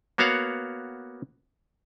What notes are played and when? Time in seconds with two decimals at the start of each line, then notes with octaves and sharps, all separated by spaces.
0.18 A#3 B3 F#4 C#5 F5 F#5